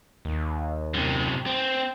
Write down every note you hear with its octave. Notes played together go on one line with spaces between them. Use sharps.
D#2
F#2 C3
C4